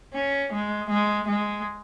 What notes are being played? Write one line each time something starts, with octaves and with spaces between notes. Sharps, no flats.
C#4
G#3
G#3
G#3